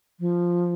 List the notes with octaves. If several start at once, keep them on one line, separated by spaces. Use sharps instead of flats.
F3